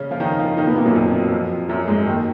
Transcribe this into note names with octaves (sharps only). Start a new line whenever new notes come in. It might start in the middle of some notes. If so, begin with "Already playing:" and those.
Already playing: C#3 C#4
F3 F4
D#3 D#4
F3 F4
D#3 D#4
B2 B3
A#2 A#3
F#2 F#3
F2 F3
F2 F3
F#2 F#3
G#2 G#3
D#2 D#3